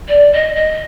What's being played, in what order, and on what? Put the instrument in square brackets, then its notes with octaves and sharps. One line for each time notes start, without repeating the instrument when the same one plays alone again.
[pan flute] D5
D#5
D#5